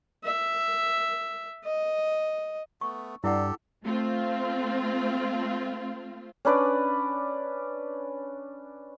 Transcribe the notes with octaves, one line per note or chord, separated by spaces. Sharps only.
E5
D#5
A3 B3 C#6
G2 E4 G4 A4 D5 F#5
A3 C4 F4
C#4 D4 B4 D5